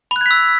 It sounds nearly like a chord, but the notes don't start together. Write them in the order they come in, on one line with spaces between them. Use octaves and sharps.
B5 F#6 G#6 B6 E6